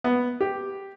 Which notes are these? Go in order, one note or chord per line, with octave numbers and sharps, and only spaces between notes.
B3
G4